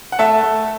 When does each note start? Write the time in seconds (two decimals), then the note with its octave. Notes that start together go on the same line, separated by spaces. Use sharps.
0.12 F#5
0.19 A3 E5 A5
0.43 A3